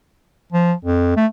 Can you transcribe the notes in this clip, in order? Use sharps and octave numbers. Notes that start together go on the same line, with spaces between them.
F3
F2
A3